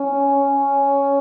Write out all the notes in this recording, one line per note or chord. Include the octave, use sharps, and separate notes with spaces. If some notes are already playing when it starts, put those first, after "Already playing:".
Already playing: C#4